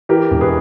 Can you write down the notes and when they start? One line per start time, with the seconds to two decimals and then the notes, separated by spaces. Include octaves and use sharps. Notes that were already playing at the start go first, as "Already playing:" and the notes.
0.09 E3 G4 A#4
0.31 E1
0.41 G#4 B4